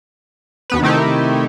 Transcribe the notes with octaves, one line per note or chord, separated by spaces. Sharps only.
D#2 B3 B4
C3 D#3 A3 D#4 E4 G4